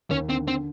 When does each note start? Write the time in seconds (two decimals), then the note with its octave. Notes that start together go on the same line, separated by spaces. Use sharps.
0.11 D#2 C#4
0.29 D3 C4
0.47 D3 C4